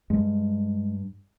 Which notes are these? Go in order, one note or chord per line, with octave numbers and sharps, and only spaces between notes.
G2 G#3